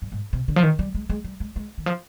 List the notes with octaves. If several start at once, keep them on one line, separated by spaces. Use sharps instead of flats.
G2
G#2
C3
D3
F3
D#3
G3
G#3
G#3
G3
G#3
G#3
D#3
F3